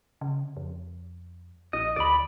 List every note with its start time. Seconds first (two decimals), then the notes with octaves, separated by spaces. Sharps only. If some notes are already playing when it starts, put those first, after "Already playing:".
0.21 C#3
0.57 F2
1.73 A#1 D#5
1.96 D2 D5 B5